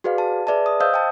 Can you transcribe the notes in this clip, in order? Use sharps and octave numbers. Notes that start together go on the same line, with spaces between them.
F#4 G#4 B4 D5 F5
A5
G#4 B4 D5 E5 A5
D#6
C5 D#5 F5 D#6 E6 G6
G5 A5